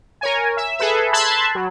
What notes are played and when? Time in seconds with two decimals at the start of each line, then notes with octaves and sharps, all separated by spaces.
0.21 A#4 C#5 G#5
0.57 E5
0.78 G#4 A4 B4 E5
1.13 A5 B5 C6 E6 F#6 G#6
1.55 F#3